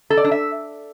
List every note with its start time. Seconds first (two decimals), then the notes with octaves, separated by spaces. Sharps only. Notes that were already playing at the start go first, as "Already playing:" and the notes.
0.10 A4
0.17 D5
0.24 D4
0.31 E5